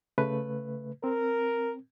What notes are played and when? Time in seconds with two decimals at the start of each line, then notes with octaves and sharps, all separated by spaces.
0.18 C#3 A3 B4
1.04 C4 A#4